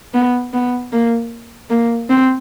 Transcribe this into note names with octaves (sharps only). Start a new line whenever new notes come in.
B3
B3
A#3
A#3
C4